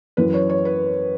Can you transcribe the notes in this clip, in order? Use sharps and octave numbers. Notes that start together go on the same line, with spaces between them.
F#2 E3 B4
C#5
C#5
B4